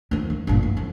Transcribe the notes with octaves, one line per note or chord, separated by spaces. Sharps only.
D#3 F3
D#3
G1 A#2
E3
F2